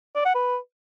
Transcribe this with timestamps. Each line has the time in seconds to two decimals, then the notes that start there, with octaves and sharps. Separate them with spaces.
0.15 D5
0.25 F#5
0.35 B4